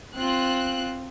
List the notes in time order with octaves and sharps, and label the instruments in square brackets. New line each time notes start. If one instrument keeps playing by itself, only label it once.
[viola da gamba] C4 [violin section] F4 F#6